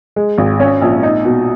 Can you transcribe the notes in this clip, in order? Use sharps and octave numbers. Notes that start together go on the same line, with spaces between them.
G#3
G#1
C#4
A#1
D#4
B2